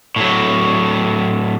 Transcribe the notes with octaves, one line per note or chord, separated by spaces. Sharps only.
A2 F#3